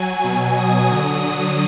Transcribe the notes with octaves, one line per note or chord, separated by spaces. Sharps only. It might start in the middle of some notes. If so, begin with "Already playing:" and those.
Already playing: F#3 G#5
B2 F#3
D#6
D3 F#3 D#6